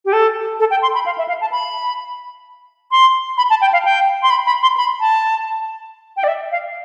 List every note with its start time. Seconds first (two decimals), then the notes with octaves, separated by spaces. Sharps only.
0.05 G4
0.13 A4
0.60 A4
0.71 G5
0.82 C6
0.94 B5
1.06 F5
1.18 E5
1.28 F5
1.41 A5
1.52 B5
2.92 C6
3.37 B5
3.50 A5
3.61 G5
3.73 F5
3.85 G5
4.23 C6
4.30 B5
4.46 B5
4.62 C6
4.77 B5
5.01 A5
6.17 G5
6.24 D5
6.28 E5
6.52 F5